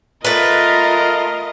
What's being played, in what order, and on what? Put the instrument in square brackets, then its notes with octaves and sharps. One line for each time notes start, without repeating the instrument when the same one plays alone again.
[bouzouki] A3 B4 [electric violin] F4 D#5 [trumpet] A#4